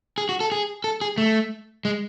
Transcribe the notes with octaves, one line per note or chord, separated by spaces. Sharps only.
G#4
F#4
A4
G#4
A4
G#4
A3
G#3